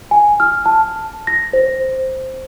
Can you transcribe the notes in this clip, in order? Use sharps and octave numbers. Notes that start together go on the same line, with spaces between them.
G#5
F6
A5
A#6
C5